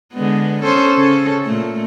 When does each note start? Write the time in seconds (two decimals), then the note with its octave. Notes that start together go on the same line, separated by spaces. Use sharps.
0.13 D3 G#3 B3
0.63 C#4 A4 C5
0.95 C#3 C#4 A4
1.45 A#2 A3